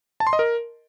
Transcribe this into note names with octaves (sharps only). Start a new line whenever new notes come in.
A5
C6
D#5
A#4